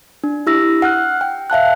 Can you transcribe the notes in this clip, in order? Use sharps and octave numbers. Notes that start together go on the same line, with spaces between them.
D4
E4 G4 E6 A#6
F#5 F6 F#6
G5
E5 F5 A5 F#6